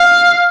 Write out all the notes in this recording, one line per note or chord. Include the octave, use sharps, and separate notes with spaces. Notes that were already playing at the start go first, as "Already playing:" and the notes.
Already playing: F5